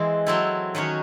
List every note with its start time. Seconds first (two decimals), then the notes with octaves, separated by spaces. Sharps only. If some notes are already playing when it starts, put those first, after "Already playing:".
Already playing: E3 G#3 C4 G#4
0.26 F#3 C4 E4 A4
0.75 D#3 F#3 C#4 F#4 C#5